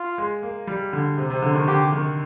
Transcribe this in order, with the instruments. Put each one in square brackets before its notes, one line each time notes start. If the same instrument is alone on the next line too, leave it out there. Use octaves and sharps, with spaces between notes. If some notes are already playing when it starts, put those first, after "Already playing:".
Already playing: [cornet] F4
[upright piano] G#3
A#3
G3
D3
C3
C3
D3
D#3
[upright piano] D3 [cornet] G4
[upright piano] D#3